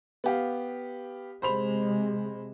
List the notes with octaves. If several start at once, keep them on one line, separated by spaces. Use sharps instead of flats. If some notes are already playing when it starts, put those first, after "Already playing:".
B3 G4 F5
C3 G#3 C5 B5 F7